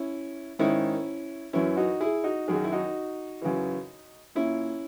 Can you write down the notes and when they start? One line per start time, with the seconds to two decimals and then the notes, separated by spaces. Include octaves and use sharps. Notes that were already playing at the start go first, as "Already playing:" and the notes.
Already playing: C#4 E4
0.59 G#2 D#3 C#4 E4
1.53 F#2 E3 C#4 E4
1.77 D#4 F#4
2.01 E4 G#4
2.24 D#4 F#4
2.48 F#2 D#3 G#4
2.55 F#4
2.64 E4
2.72 D#4 F#4
3.42 F#2 C#3 E3
4.35 A#2 C#4 E4